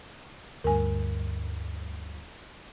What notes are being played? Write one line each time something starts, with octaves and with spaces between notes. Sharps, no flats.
D2 G2 A#4 G#5